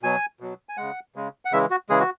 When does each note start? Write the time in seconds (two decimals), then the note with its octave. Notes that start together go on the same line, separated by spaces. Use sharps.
0.03 B2 F#3 G#5
0.40 B2 F#3
0.69 G#5
0.77 C#3 G#3 F#5
1.16 C#3 G#3
1.45 F#5
1.52 C#3 E3 G#3 E5
1.70 F#4
1.89 C#3 E3 G#3 G#4
2.00 F#4